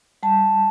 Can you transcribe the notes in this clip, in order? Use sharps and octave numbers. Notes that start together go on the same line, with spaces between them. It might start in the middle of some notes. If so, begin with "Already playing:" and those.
G3 A5